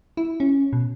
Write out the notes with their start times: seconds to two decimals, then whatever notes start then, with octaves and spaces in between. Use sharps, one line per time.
0.17 E4
0.40 C#4
0.73 B2